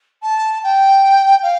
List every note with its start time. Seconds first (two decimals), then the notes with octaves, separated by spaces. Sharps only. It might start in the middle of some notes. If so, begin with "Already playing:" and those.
0.22 A5
0.63 G5
1.42 F5